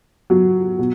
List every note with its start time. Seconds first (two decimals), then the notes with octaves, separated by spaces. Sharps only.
0.30 F#3
0.79 B2